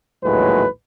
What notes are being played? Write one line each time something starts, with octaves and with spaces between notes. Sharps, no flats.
A#1 D#2 A2 F#3 G#3 B4